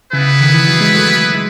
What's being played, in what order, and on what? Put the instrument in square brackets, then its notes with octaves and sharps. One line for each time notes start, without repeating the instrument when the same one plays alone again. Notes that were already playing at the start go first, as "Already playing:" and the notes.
[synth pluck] C#3 [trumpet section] B3 E4 G#4 B4
[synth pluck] D#3
E3
F#3
G#3
F#3 A3
G#3